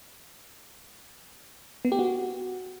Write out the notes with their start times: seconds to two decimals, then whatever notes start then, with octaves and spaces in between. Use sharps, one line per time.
1.85 B3
1.92 G4
1.99 F#4